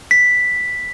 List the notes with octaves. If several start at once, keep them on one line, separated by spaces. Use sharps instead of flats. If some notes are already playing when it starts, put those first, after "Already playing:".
B6